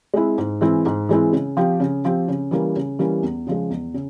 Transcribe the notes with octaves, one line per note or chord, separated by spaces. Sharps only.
G#3 C4 E4
G#2
E3 G#3 C4 E4
G#2
E3 G#3 C4 E4
C#3
F3 C4 G4
C#3
F3 C4 G4
C#3
E3 G3 A#3 C#4
C#3
E3 G3 A#3 C#4
E2
C#3 F3 G#3
E2
C#3